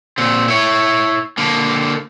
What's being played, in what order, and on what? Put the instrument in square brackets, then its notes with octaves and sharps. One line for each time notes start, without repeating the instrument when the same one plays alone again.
[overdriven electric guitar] A#2 C4
E4 C#5
D3 A#3